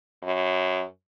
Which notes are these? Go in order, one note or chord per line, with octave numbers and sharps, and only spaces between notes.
F#2